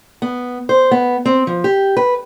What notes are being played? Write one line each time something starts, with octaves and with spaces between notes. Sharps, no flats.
B3
C5
B3
C4
F3
G4
B4